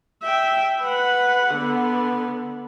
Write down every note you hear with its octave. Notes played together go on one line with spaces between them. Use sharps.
E5 G5
B4 F#5
D3 B3